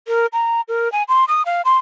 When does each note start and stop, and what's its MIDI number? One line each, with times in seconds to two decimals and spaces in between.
0.08 0.26 70
0.33 0.61 82
0.68 0.91 70
0.92 1.03 80
1.09 1.25 84
1.28 1.42 87
1.46 1.62 77
1.65 1.78 84